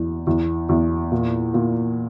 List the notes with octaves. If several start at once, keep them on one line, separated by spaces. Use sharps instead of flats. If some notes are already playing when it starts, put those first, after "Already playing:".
Already playing: E2
E2
E2
A#2
A#2